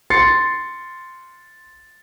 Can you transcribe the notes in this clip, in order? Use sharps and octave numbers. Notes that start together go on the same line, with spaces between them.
C6 A6 C7 C#7